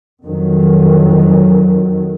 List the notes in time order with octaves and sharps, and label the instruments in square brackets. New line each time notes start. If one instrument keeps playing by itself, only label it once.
[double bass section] F2 D#3 F#3